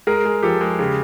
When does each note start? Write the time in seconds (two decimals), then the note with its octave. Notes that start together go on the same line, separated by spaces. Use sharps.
0.07 G#3 G#4 A#4
0.25 G#3
0.43 F3 G4 A4
0.61 G#3
0.79 C#3 G4